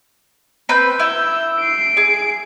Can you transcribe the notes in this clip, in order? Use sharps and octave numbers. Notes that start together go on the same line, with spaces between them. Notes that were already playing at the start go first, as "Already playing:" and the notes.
C4 B4 G6
E4 E6 G6
C7 D7
G#4